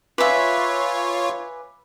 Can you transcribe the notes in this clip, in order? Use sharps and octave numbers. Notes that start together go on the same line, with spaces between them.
F4 B4 C#5 E5 F5 G#5 D6